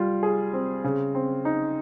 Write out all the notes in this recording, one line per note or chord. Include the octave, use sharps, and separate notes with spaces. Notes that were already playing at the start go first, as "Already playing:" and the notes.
Already playing: G3 F4
G#4
C4
C#3
C4
D#4